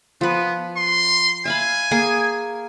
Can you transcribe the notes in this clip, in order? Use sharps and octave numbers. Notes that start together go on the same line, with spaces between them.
F3 B3 B4
C6
E5 F5 G#5 B5
A#3 G#4 A#4